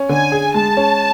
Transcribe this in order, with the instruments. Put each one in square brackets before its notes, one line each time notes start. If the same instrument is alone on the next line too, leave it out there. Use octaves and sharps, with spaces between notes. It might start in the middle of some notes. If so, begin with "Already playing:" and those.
Already playing: [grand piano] C#4
[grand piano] D3 [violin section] G#5
[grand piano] G#4
[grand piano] G#3 [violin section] A5
[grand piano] C#4